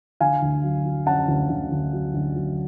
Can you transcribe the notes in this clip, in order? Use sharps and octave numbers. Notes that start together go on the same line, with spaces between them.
D3 F5 G#5
D2
F#3
F#3
C#4 F#5 A5
D2
D2
D2
F#3
D2
F#3